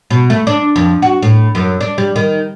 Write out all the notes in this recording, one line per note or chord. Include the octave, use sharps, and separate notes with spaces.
B2
A3
D4
F2
F#4
A2
F#2
D4
G3
D#3